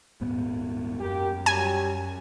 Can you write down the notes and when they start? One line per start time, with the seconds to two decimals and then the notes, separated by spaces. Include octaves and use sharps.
0.21 D#1 G#2 B3
1.00 F#2 A#3 G4
1.46 F#3 G3 G4 G#5